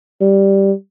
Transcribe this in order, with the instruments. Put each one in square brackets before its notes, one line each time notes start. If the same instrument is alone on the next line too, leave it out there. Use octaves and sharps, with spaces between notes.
[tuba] G3